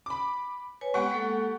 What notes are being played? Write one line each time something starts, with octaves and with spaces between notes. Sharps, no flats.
B5 D6
B4 C#5 G#5
G#3 B3 C4 G4 F#5 C#6
G#3 A#3 A4